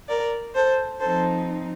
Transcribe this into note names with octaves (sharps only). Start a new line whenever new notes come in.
A#4 D5
A4 C5
F3 C4 D#4 A4 C5